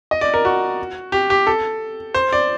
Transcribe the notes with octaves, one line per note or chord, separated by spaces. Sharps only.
D#5
D5
A#4
F#4
G4
G4
A4
C5
D5